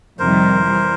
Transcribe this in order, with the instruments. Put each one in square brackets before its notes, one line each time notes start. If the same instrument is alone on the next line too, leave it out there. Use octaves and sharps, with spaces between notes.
[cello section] F2 C3 D#3 G3 [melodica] A#4 C5
[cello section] E3 G3